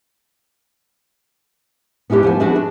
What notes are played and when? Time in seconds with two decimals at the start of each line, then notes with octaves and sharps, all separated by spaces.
2.10 B3 C#4 E4 G4 B4
2.23 F3 C5 F#5 G#5
2.40 D4 F#4 G#4 B4 E5
2.56 G#4